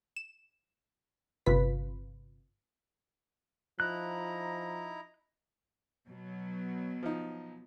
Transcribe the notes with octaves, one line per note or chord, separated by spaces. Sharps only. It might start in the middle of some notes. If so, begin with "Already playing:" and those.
E7
G1 C3 F4 B4 B6
F3 D#4 E4 A#5 F#6
B2 F#3
F3 D#4